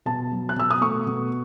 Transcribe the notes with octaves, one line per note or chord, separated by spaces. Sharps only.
B2 A5
F#3
F#6
B2 E6
D#6
A3 C#6
B2